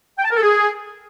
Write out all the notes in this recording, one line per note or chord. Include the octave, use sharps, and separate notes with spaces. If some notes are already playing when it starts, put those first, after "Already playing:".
G5
A5
A#4
A4
G#4